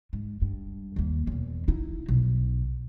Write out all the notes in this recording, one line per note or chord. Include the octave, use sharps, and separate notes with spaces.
G#2
G2
D#2 A#3
E2 B2
D#4 E4
B1